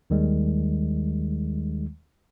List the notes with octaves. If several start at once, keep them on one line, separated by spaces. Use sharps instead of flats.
D#2 D#3 G3 G#3